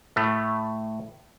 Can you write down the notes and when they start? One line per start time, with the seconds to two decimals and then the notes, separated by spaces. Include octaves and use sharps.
0.16 A2 A3